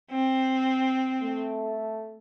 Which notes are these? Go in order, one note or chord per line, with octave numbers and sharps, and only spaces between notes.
C4
A3